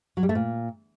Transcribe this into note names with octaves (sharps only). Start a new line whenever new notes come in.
F#3
G3
A3
A#2